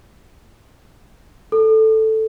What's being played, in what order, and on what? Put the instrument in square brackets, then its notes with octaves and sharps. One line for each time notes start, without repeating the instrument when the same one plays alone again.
[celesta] A4